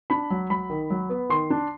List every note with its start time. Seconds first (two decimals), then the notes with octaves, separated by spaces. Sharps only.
0.10 D4 B5
0.31 F#3
0.50 F#3 B5
0.70 D#3
0.90 F#3
1.10 B3
1.29 D#3 C6
1.50 D4